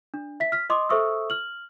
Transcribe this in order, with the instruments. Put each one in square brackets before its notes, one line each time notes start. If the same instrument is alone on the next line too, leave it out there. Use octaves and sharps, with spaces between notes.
[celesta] D4
E5 B6
F6 B6
D#5 C6 D6 D#6
A4 C5 E5 C#6 D#6 E6
F6 F#7